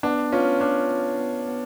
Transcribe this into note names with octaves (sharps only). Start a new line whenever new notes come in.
B3 D4
C#4 F4 B4
D4 F4
B3
B3
B3